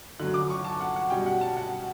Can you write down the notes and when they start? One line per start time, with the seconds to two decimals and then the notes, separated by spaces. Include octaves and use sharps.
0.20 D3 F#3 C#4 F#6
0.34 D6
0.50 C#6
0.65 A5
0.80 F#5
0.96 F#5
1.10 B2 G3 C#4 G5
1.26 F#5
1.41 A5
1.57 F#5